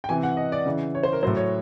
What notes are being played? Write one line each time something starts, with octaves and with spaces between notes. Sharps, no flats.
G5
C3 E3 G#5
F#5
D#5
D5
C#3 E3
C#5
C5
A#4
A2 F#3 C5
C#5